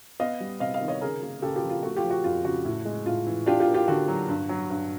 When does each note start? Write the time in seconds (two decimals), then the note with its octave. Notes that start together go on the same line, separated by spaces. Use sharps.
0.20 B3 D#5 F5
0.40 G3
0.60 C3 D#5 F5
0.74 D#5 F5
0.81 D#3
0.88 C#5 D#5
1.01 C#3 G#4 A#4
1.22 A#3
1.42 C#3 G4 A4
1.56 F4 G4
1.63 F3
1.70 F4
1.83 A3 F#4
1.96 F4 G4
2.03 F3
2.11 F#4
2.24 F2 F4
2.45 C#3 F#4
2.65 A2
2.85 G#3
3.06 A2 F4
3.27 E3
3.46 D4 F4 G4
3.60 F4 G4
3.68 A#3
3.74 F4 G4
3.88 D3 F#4
4.08 F#3
4.28 G2
4.49 F#3
4.70 G2